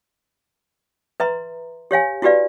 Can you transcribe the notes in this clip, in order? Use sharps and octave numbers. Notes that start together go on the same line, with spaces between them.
B4 E5 A#5 C6
G4 C#5 F5 G#5
E4 F#4 G4 B4 D5 F5